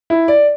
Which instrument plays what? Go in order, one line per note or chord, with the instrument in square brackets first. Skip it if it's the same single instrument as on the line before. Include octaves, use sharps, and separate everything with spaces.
[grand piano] E4
D5